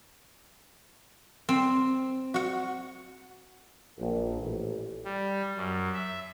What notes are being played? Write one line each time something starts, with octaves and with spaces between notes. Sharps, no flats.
C4
F#4 F#5
A#1
A1
G3
F#2
E5